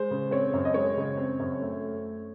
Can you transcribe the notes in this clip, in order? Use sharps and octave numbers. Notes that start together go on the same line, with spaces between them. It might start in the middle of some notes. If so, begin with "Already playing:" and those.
Already playing: G#3 C5
C#3
C4 C#5
F#2
D#5
G#3 C#5
C#3
C4
F#2
A3